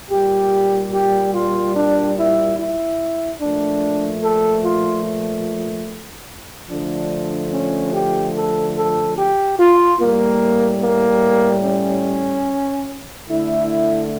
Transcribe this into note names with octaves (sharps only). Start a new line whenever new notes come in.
A#2 G3 G4
G4
F4
D4
E4
E4
A#2 F3 A3 D4
A4
F4
D3 F3 A3 D4
C#4
G4
A4
A4
G4
F4
A2 G3 A#3
A#3
C#4
D3 A3 E4